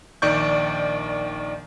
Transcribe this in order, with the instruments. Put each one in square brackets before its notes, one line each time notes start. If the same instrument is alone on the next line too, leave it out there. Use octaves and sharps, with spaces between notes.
[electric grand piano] A#1 D#3 D5 C#6 G6